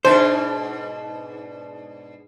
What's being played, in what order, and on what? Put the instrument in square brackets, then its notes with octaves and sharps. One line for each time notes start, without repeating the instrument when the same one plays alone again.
[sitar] G#2 B2 D4 [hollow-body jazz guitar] C5